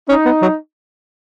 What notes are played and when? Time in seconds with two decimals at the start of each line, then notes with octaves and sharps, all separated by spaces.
0.09 C#4 D#4
0.25 B3
0.42 F#3